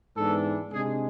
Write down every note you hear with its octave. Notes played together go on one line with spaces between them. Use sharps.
G#2 E3 B3 D4 A4
C3 G#3 D4 G#4